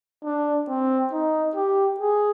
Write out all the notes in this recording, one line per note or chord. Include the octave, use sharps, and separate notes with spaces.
D4
C4
D#4
G4
G#4